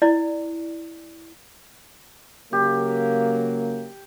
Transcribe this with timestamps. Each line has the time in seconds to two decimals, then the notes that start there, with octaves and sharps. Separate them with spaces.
0.02 E4 D5
2.53 C#3 F#3 A#3 G4